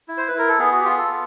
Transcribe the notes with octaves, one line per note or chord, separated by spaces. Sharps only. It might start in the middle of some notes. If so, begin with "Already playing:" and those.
E4
C5
B4
E4 A#4
A4
B3 G#4
F#4
G4
F4 G#4
A4
B3